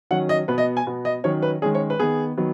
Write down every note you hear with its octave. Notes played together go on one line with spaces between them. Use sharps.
D#3 F#3 C#4 F#5
D#5
B2 B3 B4
D#5
G#5
B2 B3
D#5
D#3 F#3 C#4 C#5
B4
D#3 G#3 C#4 G#4
C#5
B4
D#3 B3 G#4
D#3 F#3 B3